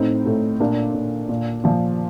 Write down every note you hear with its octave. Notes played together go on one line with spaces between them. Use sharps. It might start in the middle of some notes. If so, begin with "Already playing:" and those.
Already playing: A2 C4 D#4
A2
A#2 A#3 D4
A#2
A#2
A#2 F3